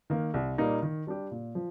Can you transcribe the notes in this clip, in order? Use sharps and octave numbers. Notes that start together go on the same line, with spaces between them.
D#3 A#3
C2
A#2 G3 A#3 D#4
D#3
G3 D4 G4
A#2
F3